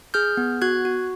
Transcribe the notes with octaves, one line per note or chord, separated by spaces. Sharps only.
G#4 F6 G6
B3
F#4 F#6 G#6
F#4